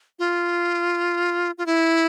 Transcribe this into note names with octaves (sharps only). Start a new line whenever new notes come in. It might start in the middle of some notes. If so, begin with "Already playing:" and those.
F4
F4
E4